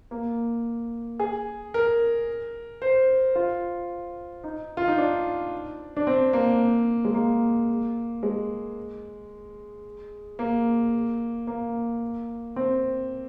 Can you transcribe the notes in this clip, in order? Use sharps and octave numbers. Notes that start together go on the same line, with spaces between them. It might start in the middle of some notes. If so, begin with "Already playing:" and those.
A#3
G#4
A#4
C5
F4
D#4
F4
D#4
D4
D4
C4
A#3
G#3
A#3
G#3
A#3
A#3
C4